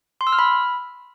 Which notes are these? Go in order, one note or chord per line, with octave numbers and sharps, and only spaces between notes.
C6
E6
F6
B5